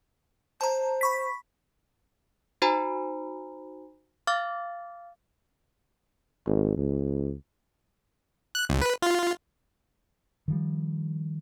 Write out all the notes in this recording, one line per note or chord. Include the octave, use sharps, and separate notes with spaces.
C5 A5 A#5
B5 C#6 B6
D#4 F#4 C5 G#5 A#5 B5
F5 D6 F6 A6
G#1
C#2
F#6
C#2
B4
F4
D#3 F3 G3